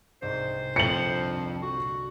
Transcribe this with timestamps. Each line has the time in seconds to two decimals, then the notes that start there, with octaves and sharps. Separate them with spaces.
0.22 C2 G#2 C5
0.76 G1 F2 C#7 F#7
1.62 F#4